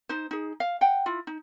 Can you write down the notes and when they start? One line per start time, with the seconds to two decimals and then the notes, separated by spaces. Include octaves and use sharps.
0.09 D#4 C5
0.31 D#4 G#4
0.60 F5
0.81 F#5 G5
1.06 E4 F4
1.27 D#4